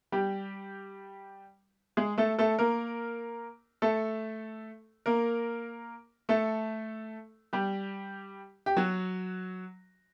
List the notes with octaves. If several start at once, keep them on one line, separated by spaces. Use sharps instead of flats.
G3 G4
G#3 G#4
A3 A4
A3 A4
A#3 A#4
A3 A4
A#3 A#4
A3 A4
G3 G4
G4
F#3 F#4